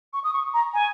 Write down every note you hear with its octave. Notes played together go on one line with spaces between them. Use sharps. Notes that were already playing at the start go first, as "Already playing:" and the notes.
C#6
D#6
C#6
A#5
G#5